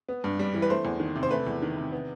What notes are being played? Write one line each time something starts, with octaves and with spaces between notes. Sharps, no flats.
B3
G2
G3
E3
B4
A3 C5
E2
D#3
C3
C5
A3 B4
E2
D#3
C3
B3